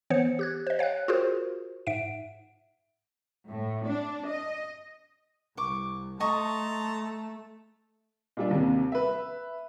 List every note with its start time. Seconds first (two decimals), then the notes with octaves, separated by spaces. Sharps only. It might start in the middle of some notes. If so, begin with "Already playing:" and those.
0.10 E3 B3 C5 C#5 C#7
0.39 G4 F#6 G#6
0.67 C5 D#5
0.79 C#5 F5 G5 F#6
1.08 F4 F#4 G#4 A#4 C5
1.87 G#2 E5 F#5 D7
3.48 A2
3.86 D4
4.28 D#5
5.57 C2 C#6 D6
6.20 A3 D#5 A5 A#5 C6 C#6
8.37 A#2 G3 D4
8.51 D#2 C3
8.92 B4 E5